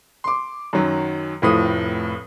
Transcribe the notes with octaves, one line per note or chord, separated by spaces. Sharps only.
C6 D6
F#2 D#3 F#3
F1 A2 F3 D#6